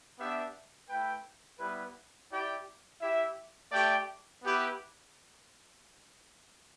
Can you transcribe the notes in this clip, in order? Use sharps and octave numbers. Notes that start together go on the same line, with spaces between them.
B3 D4 G4 E5
A3 E4 B4 G5
G3 B3 E4 B4
E4 G4 D5 G5
E4 G4 E5
A3 G4 D5 G5
B3 E4 G4 B4